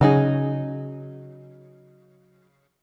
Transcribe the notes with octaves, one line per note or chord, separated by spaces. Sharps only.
C#3 F#3 D#4 G#4